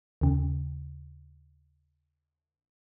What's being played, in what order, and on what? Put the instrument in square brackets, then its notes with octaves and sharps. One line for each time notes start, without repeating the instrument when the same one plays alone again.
[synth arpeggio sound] D#2 C#3